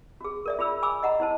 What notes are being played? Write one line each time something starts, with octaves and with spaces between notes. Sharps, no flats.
F#4 G#4
A#4 D5 E5
F4 G#4 B5 E6
G#5 B5 D6 E6
D#5 F#5 A#5
E4 C5 A5